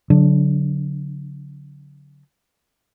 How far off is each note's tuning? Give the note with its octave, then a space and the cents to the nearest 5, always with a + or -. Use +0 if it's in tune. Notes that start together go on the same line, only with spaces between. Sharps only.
D3 -40 F#3 -20 D4 +0